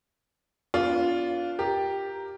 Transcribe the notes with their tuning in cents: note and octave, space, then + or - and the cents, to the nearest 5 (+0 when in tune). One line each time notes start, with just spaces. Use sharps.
B3 +0 D4 -30 F4 +0
G4 +0 A#4 +0